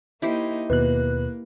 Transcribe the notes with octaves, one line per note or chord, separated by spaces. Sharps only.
A#3 D#4 E4 G4 C5
D#2 B2 A#3 B4 F#6